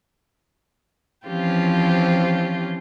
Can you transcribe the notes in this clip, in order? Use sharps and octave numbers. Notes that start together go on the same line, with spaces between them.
E3 F3 C4 C#4 F4 G4